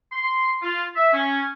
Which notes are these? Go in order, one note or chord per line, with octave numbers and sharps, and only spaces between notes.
C6
F4
E5
C#4